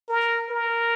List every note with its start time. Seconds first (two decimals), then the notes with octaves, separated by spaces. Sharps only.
0.09 A#4
0.49 A#4